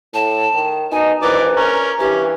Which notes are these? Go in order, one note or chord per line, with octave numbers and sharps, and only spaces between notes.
A2 A5
D#3
B2 D#4 G#5
A#1 E3 A#4 B4 D5
C#4 A#4
G2 E3 C#4 G4